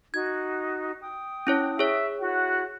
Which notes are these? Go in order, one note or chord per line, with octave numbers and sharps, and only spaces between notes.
D#4 F#4 G#6
G5 D#6
C#4 E4 C#5
G#4 C#5 E5
E4 F#4 F#5